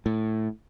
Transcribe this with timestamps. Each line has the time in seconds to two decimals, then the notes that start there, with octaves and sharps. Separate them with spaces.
0.06 A2